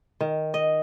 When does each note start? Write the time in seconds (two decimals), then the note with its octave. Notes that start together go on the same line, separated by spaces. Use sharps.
0.21 D#3
0.54 D#5